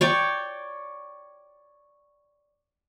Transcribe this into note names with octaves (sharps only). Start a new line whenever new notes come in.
C#5 D5 G5